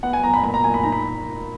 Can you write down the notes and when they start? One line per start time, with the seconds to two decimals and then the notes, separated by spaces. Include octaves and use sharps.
0.03 B3 F#5
0.13 G#5
0.24 B3 A#5
0.34 B5
0.44 A#2 B5
0.54 A#5
0.64 A#2 G#5
0.74 B5
0.83 D#4 A#5
0.92 B5